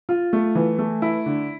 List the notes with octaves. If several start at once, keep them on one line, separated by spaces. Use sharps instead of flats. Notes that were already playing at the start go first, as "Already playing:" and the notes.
F4
A3
E3
A3
E4
D3